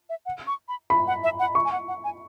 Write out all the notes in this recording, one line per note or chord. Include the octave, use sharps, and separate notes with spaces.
E5
F#5
C#6
B5
B5
F#5
E5
F#5
C#6
G#5
F#5
F#5
G#5